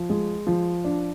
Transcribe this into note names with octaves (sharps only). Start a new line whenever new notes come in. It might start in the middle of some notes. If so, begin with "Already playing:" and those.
Already playing: F3
G#3
F3
D4